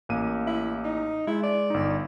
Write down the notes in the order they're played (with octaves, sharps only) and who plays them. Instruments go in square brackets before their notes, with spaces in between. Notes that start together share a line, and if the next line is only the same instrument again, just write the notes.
[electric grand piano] A1 A#3 D#7
[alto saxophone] E4
D#4
[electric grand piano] G#3 [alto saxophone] E4
[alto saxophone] D5
[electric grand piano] G1 D#4